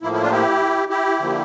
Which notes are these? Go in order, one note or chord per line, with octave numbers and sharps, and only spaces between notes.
A2 F3 A#3 E4
E4
D4 F4
E4 G4
E4 G4
D3 F3 A#3